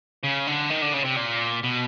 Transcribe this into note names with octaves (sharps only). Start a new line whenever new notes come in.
C#3
D3
D#3
D3
C#3
C3
A#2
B2